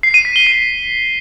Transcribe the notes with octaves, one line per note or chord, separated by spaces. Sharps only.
C7
D#7
B6
G7
D#7